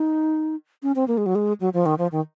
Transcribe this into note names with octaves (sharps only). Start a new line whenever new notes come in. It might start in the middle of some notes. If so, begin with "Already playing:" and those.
Already playing: D#4
C#4
C4
A#3
G#3
F#3
G#3
F#3
F3
D#3
F3
D#3